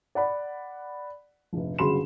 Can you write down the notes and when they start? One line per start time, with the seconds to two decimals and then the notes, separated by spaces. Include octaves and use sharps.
0.15 D5 F#5 B5
1.53 F1 A#1
1.79 G1 C#3 F#3 B5 C6 E7